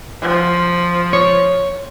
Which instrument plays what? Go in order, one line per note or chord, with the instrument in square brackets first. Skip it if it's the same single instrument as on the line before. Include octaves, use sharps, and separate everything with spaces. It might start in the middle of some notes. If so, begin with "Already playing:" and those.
[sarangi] F3
[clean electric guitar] C#5